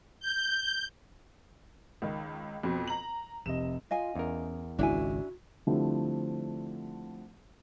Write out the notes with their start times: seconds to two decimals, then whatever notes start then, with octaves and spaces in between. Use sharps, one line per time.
0.20 G6
2.02 C#2 D#3
2.63 F2 B2 C4
2.87 A#5 F#7
3.46 F1 C3 D#5 E7
3.91 F4 D#5 F5 G#5
4.15 E2 C#4 A#4
4.79 G#1 C#2 D4 E4 F#4 G#5
5.67 D3 F3 G3 A3 C4 E4